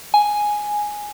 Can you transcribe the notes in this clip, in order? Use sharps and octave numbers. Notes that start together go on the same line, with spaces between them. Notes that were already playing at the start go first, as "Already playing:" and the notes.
G#5